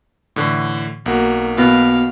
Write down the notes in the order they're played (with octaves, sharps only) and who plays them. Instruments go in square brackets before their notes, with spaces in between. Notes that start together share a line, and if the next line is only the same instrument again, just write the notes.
[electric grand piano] A2 D3 E3
[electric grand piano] B1 F#4 [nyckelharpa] A#3
[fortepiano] B2 [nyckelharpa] F5